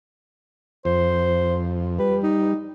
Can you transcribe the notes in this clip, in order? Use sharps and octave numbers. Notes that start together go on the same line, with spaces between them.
F2 C5
G3 B4
D#4